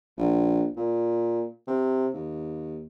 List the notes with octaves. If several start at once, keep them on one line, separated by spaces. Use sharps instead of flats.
A#1
A#2
C3
D#2